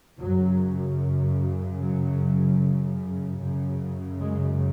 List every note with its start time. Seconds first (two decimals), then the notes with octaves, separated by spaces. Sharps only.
0.20 F#2 C#3 F#3
1.80 F#3
3.40 F#2 C#3
4.20 G#3